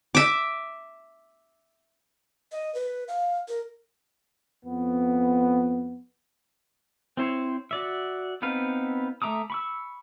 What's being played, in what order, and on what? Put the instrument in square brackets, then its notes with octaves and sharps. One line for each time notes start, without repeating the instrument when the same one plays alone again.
[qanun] E5 D6
[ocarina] D#5
B4
F5
A#4
[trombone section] F2 B3
[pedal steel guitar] C4 E4 C5 C#5
F#4 D5 E5
B3 C4 D#4 B4 F5
A3 E5 A#5 D6 D#6
B5 C#6 E6